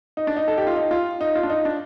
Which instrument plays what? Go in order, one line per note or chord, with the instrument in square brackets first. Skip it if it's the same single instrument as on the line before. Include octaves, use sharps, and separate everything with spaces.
[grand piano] D#4
D4
D#4
A4
G4
F4
D#4
F4
D#4
F4
D4
D#4
D4